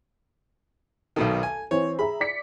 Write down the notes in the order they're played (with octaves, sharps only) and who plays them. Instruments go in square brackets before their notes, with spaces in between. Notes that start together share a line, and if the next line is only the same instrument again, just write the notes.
[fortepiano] B1 B2 D#3 [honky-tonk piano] A4
[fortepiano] G#5
[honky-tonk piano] E3 C4 [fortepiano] C#5
[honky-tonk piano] G#4 E5 A#5 [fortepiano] B5
[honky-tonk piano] D5 B6 C#7